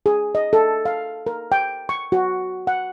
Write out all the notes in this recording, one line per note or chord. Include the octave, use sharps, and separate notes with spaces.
G#4
D#5
A4
F5
A#4
G5
C#6
F#4
F#5